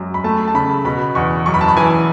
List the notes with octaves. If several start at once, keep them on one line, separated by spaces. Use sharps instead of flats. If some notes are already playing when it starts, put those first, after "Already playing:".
Already playing: F#2 G#3
B5
A3 A5
A5
C#3 B5
B2 B5
E2 C#6
F#2 C#6
B5
A5
B5
E3 G#5